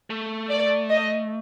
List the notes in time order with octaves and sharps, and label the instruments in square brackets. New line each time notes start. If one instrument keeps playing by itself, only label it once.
[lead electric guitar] A3
[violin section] D5
D#5